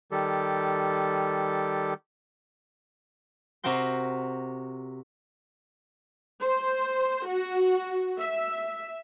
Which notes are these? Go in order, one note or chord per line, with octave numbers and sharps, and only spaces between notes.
D#3 G3 G4 A4
C3 F#4 A#4 G5 C6
C5
F#4
E5